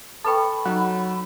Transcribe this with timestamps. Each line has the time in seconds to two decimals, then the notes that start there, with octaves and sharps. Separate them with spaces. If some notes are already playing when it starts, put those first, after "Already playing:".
0.24 A4 B4 G5 A5 B5 C#6
0.66 F#3 D#4 F#5